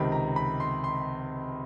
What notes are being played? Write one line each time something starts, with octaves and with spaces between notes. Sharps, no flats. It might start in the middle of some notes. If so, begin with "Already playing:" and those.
Already playing: C#2 C3 D#3 B5
A#5
B5
C6
C6